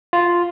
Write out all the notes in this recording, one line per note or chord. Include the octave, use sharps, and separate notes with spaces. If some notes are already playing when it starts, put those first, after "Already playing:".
F4